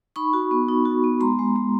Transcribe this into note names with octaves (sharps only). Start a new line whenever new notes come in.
D#4 B5 C#6
F#4
B3
D#4
F#4
B3
G#3 A#5 C6
G#3
G#3